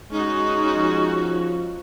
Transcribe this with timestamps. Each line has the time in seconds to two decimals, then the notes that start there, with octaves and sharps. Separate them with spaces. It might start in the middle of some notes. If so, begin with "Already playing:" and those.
0.11 G#3 C#4 D#4 F#4
0.74 F3